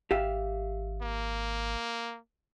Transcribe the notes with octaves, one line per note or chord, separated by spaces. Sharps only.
G#1 G4 E5 F5
A#3